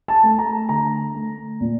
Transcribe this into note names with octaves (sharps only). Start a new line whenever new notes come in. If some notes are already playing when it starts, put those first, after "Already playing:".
A5
A3
A#5
D3 A#5
A3
A#2